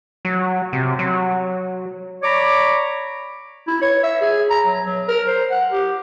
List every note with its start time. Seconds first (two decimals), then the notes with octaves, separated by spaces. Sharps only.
0.25 F#3
0.73 C3
0.99 F#3
2.23 C#5 D5 A#5 B5 C#6 D6
3.67 E4
3.82 C#5
4.03 E5
4.21 G#4
4.50 A#5
4.67 F#3
4.85 F#3
5.08 A#4
5.27 C5
5.51 F#5
5.71 G4